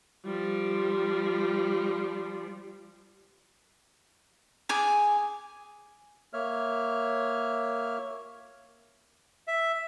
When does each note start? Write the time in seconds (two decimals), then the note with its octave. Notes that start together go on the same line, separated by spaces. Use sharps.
0.25 F3 G3
4.69 G#4 G#5 D6
6.33 A#3 C#5 E5 F6
9.48 E5